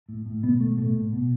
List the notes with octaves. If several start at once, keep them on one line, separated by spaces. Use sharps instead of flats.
A2
A2
B2 B3
B2 A3
A2 A3
A2
B2